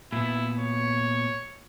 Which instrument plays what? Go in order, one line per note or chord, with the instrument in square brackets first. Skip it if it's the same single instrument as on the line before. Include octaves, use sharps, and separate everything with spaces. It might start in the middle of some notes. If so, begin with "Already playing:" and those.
[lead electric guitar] A#2 B3 [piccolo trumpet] E4
[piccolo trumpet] C#5